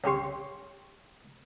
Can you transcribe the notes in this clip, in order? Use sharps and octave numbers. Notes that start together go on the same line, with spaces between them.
C2 C#3 G4 C6 C#6